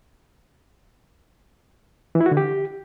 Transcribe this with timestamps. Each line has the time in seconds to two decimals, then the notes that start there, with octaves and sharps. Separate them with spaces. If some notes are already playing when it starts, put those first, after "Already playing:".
2.15 E3
2.21 E4
2.26 F#4
2.31 D3
2.37 G4